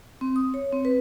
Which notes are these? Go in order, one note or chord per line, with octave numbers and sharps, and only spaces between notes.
C4
D#6
C#5
C4
B4